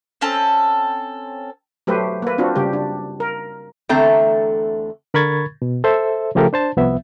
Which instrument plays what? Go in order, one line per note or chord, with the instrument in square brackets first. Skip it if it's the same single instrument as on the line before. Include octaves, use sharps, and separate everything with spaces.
[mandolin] C4 C#4 A4
[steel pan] F#3 A3 G4 B4 C5
A#3 B4
C4 D4 F4 F#4
C#3 G3 G4
D4
A#4
[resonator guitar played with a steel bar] E2 D3 A3 C4 A5 A#5
[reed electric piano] D3 A#4 B5 C#6 G#6 A6
B2
A4 C5 E5
C#3 F3 A3 G4 A4 A#4
D4 C5 A5
C2 F3 B3 E5